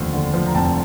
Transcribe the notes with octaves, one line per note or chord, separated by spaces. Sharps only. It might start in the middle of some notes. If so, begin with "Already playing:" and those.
Already playing: F1 D#2 D3 F3
D3
F3
A#5
F1 G5 A5